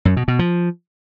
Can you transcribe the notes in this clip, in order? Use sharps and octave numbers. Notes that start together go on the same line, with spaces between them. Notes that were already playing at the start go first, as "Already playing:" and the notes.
F#2
B2
B2
F3